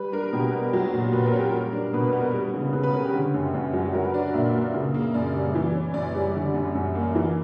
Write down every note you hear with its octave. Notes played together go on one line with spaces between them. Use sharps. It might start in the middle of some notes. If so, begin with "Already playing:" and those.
Already playing: G3 B4
D4 A#4
B2 G4
B3
F#3
A#2
A#2 B4
A#4
C#4
G4
G3 A#4
D4
B2 B4
B4
B3
A#4
G3
C#3
C#3 B4
B4
C#4 A#4
G4
D3
F#2
F#2
F#3
F#3 A#4
B4
D4 D5
A#2 E5
A#3
C#3
A#3
F#2 D5
G3
E3
C#4
F#2 D5
G3
D3
F#2
F#2
A#3
E3